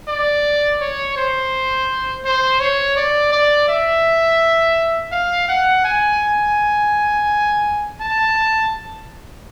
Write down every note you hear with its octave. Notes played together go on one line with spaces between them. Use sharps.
D5
C#5
C5
C5
C#5
D5
D5
E5
F5
F#5
G#5
A5